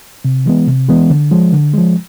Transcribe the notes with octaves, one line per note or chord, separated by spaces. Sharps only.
C3
E3 G#3 B3
C3
E3 G#3 B3
D3
F3 G#3
D3
F3 G#3